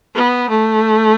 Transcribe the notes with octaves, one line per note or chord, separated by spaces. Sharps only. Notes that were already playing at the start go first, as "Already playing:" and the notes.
B3
A3